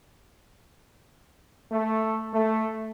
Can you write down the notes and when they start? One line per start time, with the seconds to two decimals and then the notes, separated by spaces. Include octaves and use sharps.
1.71 A3
2.34 A3